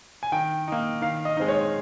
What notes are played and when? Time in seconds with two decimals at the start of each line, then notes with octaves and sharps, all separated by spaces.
0.23 G#5
0.32 D#3 G5
0.68 A#3 D#4
1.02 D#3 F5
1.25 D#5
1.37 G#3 C4 D#4
1.48 C#5